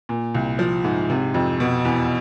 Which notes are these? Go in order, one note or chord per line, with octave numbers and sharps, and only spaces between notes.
A#2
C2
F3
G#2
C3
F2
B2
E2